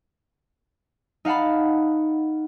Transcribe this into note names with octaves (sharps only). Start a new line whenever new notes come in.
D#4 F5 F#5 A5 B5